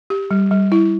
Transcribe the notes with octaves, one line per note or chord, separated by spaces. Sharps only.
G4
G3
G3
E4